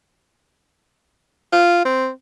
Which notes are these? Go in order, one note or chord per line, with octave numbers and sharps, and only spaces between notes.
F4
C4